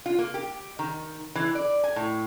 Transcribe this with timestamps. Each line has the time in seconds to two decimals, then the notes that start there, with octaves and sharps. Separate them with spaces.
0.06 F4
0.19 A#3
0.34 G4
0.79 D#3
1.35 E3
1.55 D5
1.84 G#5
1.96 A2